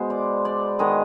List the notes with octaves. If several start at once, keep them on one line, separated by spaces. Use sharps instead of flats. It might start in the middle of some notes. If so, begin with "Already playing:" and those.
Already playing: B2 G#3 B3 C5
D5
D5
D#3 G#3 B3 D#5